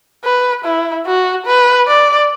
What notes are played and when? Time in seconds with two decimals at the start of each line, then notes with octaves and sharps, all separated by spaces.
0.24 B4
0.65 E4
1.06 F#4
1.46 B4
1.87 D5